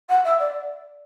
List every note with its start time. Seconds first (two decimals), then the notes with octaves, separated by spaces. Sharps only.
0.09 F#5
0.24 E5
0.39 D5